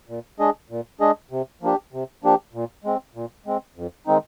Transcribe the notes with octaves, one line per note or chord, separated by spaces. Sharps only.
A#2
G#3 D4 G#4 D#5
A#2
G#3 D4 G#4 D#5
C3
F3 A#3 D4 G4
C3
F3 A#3 D4 G4
A#2
G#3 C4
A#2
G#3 C4
F2
D#3 G#3 C4 D#4